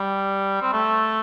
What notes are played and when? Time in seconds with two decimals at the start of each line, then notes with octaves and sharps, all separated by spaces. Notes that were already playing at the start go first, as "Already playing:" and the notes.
Already playing: G3
0.62 C4
0.73 A3